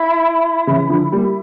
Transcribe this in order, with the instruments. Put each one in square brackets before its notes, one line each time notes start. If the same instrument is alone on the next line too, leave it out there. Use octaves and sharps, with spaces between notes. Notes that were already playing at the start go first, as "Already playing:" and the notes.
Already playing: [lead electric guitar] E4
[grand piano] C#3 E3
D3 F3
G3 A#3